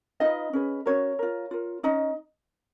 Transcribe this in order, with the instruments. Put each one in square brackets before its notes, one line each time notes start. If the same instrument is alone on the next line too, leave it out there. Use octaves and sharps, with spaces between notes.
[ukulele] D#4 F4 B4 D#5
C#4 G#4 B4
C#4 F#4 A#4 C#5
F4 A#4
F4 A#4
C#4 D#4 D#5